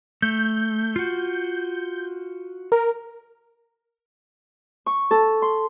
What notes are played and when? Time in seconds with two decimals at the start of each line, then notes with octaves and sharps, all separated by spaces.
0.22 A3 G6
0.96 F4 F#4
2.72 A#4
4.86 C#6
5.11 A4
5.42 C6